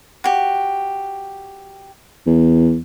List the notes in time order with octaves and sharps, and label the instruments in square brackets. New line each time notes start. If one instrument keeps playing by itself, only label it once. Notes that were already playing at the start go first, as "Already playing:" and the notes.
[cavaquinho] F#4 G4
[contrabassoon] E2